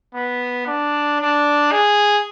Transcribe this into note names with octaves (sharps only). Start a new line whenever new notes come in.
B3
D4
D4
G#4